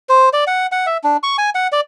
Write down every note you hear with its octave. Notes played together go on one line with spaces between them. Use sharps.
C5
D5
F#5
F#5
E5
D4
C#6
G#5
F#5
D5